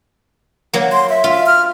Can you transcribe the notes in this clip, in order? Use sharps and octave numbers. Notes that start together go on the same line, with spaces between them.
F#3 A#3
C6
E5
F4
F6